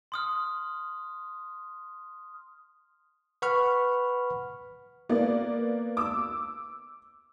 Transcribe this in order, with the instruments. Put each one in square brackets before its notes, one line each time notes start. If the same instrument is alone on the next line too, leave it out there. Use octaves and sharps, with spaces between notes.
[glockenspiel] C6 D#6 F6
[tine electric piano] B4 F#5 B5 C#6 F6
[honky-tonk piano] A#3 B3 D5
D6 E6